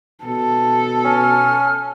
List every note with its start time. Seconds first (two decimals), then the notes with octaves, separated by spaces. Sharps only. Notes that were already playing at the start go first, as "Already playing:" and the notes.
0.25 B2 A4
1.05 C#4 F6